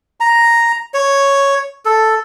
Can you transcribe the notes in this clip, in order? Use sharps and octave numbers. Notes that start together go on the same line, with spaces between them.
A#5
C#5
A4